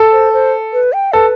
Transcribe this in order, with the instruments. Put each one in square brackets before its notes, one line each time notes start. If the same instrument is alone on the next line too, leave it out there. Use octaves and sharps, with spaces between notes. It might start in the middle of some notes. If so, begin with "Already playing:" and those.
Already playing: [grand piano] A4
[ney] C5
C5
B4
G5
[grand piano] A4 [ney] B4